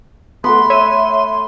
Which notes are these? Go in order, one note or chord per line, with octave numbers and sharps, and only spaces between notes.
A3 B3 F#5 B5 C6
C#5 E5 D#7